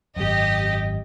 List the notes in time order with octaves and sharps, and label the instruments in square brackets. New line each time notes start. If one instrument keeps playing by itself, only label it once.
[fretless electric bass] G#1 F#2 [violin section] G4 D#5